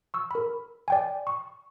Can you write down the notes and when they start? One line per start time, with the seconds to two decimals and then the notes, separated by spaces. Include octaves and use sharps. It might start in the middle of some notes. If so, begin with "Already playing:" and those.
0.14 C#6 E6
0.31 A#4 B5
0.88 D5 G5 G#5
1.27 C#6